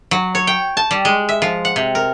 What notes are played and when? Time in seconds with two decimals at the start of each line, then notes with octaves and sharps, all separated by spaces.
0.11 F#3
0.35 C#5
0.47 G5
0.77 A5
0.91 G3
1.05 G#3
1.29 E5
1.42 F3
1.65 F#5
1.76 C3
1.95 A#4